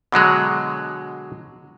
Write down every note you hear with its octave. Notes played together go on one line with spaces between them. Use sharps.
B2 D3 F#3 G#3